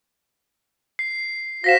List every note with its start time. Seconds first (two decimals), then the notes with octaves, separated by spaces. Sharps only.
0.99 C7
1.64 F#4 C5 F5 A#6 B6 E7